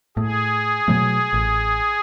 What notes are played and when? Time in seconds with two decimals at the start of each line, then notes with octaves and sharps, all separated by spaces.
0.17 A2 G#4
0.88 B2 F#3 A3
1.33 A1